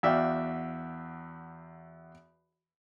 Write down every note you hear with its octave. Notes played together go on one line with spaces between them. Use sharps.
E2 F#4 D5 E5 F5 G5